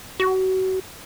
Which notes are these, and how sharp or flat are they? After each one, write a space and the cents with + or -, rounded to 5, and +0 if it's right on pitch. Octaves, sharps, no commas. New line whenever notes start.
F#4 +30